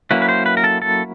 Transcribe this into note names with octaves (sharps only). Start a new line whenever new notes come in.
F#3 A#3 C#4 E4 B4
B4
C5
B4
A#4
A4
A4